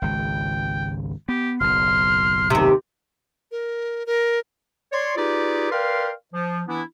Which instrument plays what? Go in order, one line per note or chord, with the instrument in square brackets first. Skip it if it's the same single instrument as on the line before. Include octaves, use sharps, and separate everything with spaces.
[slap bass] G#1 C#2 [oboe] G5
[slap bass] B3 [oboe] G4
[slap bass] F#1 B1 [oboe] C6 [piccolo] F6
[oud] D#2 C3 [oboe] E5
[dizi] A#4
A#4
[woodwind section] C#5 D5 C6
D#4 F4 G4 G#4 B4 D5
A#4 B4 D5 F5 G5 C6
F3
E3 B3 D4 E4